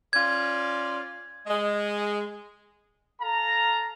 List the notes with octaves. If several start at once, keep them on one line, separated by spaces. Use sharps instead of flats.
C#4 F4 D5 G#6
G#3
A4 F5 A5 A#5